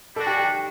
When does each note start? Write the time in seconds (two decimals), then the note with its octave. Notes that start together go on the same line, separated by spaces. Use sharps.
0.15 G3 D4 F#4 A4
0.27 G4
0.37 G4